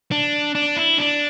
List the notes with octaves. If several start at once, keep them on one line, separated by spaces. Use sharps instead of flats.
D4
D4
E4
D4